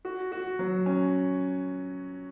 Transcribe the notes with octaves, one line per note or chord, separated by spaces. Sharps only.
F#4
F#4
F#3
C#4